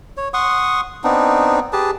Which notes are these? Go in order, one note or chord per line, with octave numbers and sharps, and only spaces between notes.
C#5
F#5 C6 C#6 D#6
B3 C4 D4 D#4
G4 G#4 B4 A5